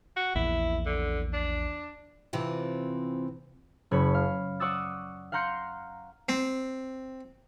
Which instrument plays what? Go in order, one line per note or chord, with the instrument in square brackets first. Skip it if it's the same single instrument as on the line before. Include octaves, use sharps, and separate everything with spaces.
[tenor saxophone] F#4
[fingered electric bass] A#1 E2 [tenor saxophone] E4
[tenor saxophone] D3
D4
[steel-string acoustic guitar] C3 E3 C4 F4
[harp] F#1 C#5 B5
F5
D5 F#5 C#6 D#6 E6 A6
F5 F#5 A#5 C6 G6 C#7
[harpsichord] C4